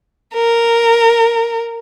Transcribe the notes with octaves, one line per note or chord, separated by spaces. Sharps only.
A#4